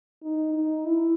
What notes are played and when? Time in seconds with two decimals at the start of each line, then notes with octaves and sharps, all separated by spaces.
0.23 D#4
0.54 D#4
0.86 E4